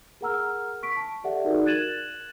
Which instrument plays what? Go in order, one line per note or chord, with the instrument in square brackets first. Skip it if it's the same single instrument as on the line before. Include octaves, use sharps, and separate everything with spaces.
[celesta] G#4 A#4 F#5 A#5 E6 F6
C#6 B6 D7
A5
G4 A4 D5 E5 F#5
D#4 F#4 G#4 A#4 D5
F#6 G#6 A6 D#7 E7 F#7